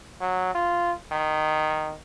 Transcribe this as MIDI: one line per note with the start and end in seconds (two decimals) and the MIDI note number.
0.21 0.50 54
0.55 0.92 65
1.12 1.94 51